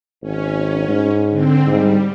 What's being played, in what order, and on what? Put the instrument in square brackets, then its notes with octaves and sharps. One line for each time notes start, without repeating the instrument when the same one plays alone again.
[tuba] G#1 [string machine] C#4
[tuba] G#2
[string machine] D3 C4
[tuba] G#2 [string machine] G3